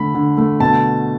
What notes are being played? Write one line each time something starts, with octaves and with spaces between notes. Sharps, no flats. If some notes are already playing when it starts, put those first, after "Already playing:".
Already playing: D3 A3 B5
D3
A3
B2 A5